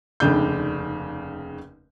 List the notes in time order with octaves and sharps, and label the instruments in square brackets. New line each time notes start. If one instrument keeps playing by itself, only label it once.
[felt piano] F1 D#2 C#3 D4 G6